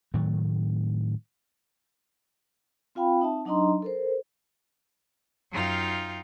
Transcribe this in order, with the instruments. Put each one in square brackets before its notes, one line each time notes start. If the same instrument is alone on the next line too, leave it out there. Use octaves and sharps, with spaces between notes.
[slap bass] A2 D#3 F#3 A3
[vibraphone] C4 F4 F5 G5 B5
C4 D#4 E5 A5
F#3 D4 D#4 D#5 A#5 C6
A4 A#4 C5
[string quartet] F#2 D#4 F4 F5 G5